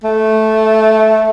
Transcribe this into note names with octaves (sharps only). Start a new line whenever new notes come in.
A3